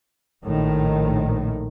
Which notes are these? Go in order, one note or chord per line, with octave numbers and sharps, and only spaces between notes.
A#1 A2 D#3